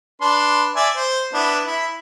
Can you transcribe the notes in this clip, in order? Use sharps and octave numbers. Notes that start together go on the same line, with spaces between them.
D4 B4 C6
D5 E5 G#5
C5
B3 D4 E4
E4